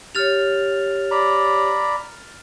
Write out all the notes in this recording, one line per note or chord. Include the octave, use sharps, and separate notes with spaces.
G4 C#5 F6 A6 F7
D5 A#5 B5